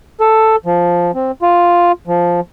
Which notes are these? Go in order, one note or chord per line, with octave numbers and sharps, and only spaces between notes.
A4
F3
C4
F4
F3